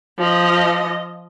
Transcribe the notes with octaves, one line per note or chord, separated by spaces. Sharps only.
F3 D#5